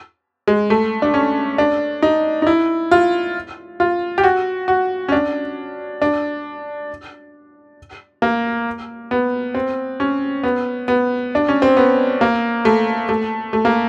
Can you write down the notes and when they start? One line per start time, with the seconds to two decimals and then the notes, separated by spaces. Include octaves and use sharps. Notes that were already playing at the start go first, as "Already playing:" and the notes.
0.47 G#3
0.70 A3
1.02 D4
1.14 C#4
1.58 D4
2.02 D#4
2.42 D#4
2.47 E4
2.91 F4
3.80 F4
4.18 G4
4.24 F#4
4.68 F#4
5.09 C#4
5.12 D4
6.02 D4
8.22 A#3
9.11 B3
9.55 C4
10.00 C#4
10.43 B3
10.88 B3
11.35 D4
11.49 C#4
11.62 C4
11.77 B3
12.21 A#3
12.65 A3
13.09 A3
13.53 A3
13.65 A#3